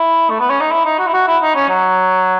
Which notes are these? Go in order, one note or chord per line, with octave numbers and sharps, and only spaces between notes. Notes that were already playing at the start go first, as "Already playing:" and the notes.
Already playing: E4
A3
B3
C#4
D#4
E4
D#4
F#4
E4
F#4
E4
D#4
C#4
F#3